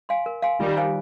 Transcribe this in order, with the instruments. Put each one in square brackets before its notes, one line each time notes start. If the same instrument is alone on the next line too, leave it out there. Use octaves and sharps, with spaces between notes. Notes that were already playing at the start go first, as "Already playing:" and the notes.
[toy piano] F5 G#5 C6
A#4
F5 G#5 C6
[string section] D#3 G3 [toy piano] F4
[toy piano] C5 F5 G#5